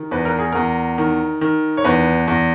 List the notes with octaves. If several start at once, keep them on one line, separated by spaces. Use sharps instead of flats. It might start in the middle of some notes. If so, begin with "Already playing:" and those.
Already playing: D#3
E2 B4
A#4
G#4
E2 A#4
D#3
D#3
C#5
E2 B4
E2